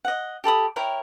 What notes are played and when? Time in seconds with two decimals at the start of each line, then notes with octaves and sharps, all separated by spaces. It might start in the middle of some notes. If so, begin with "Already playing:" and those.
0.05 D#5 F#5
0.44 G4 A4 B5 D#6
0.76 E4 A#4 C#5 G5